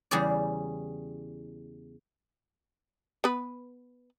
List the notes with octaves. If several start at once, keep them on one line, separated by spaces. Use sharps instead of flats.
E2 C#3 G3 G#4 C#5 D5
B3 B4